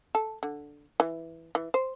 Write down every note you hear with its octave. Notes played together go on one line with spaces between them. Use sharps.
A4
D3
E3
E3
C5